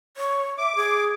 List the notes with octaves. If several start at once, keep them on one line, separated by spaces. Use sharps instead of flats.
C#5
E5 D6
G#4